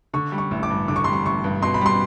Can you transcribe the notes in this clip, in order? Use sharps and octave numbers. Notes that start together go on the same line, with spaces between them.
D3 C#6
G3
C#6
A1
D6
G2
D3 D6
C#6
G3 C6
C#6
A1 C#6
G2
B2 C6
B5
G3 C6